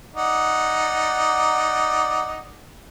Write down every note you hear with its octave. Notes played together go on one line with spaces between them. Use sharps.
D#4 D5 F#5